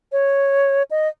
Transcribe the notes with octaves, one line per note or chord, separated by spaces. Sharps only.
C#5
D#5